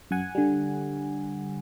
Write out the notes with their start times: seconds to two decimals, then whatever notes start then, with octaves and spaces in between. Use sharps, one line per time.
0.11 F#2 F#5 G#5
0.35 D3 G3